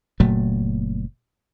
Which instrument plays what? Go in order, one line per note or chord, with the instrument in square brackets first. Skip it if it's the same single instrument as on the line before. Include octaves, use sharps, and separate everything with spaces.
[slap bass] F#1 A#2 F#3 A3